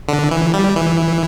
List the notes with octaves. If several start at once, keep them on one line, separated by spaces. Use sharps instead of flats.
D3
E3
G3
E3